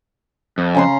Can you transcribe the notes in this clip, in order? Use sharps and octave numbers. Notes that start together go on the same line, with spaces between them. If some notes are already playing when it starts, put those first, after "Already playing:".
F2
C#3 A#5 C6